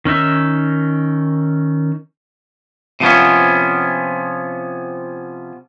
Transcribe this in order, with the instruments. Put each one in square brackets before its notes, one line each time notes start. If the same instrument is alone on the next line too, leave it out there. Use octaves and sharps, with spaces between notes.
[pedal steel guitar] D#3 C#4 D#4 E5
[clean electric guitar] C3 F3 B3 C#4